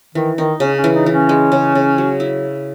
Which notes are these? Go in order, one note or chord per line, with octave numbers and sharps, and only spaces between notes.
D#3 E3
D#3 D#4
C#3 C#4
C#4
E3
D#4
E3
C#4
G#3
C#3
C#3
F#3
E4